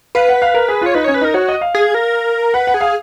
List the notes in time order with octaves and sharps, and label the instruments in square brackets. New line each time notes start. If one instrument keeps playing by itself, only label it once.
[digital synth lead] B4 [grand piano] F5
[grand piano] F#5
F5
A#4
G#4
[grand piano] F4 [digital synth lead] C#5
[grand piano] D#4 [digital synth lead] B4
[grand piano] C#4 [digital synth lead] C#5
[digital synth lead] B4
[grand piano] D#4 [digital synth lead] A#4
[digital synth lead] F#4 [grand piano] C#5
[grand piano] D#5
F5
[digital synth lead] G#4
A#4
[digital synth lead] B4 [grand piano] F#5
[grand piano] F#5
[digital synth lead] G#4
[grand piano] F5